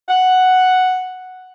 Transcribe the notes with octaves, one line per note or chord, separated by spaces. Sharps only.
F#5